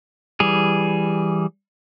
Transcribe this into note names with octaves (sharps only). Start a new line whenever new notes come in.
E3 G3 G#4